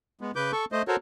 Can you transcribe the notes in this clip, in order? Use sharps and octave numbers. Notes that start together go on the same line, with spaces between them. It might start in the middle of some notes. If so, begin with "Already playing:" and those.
G#3 B3
C#3 B4 D6 G6
A4 C#6
A3 C5 D#5
F#4 A4 A#4 C5 C#5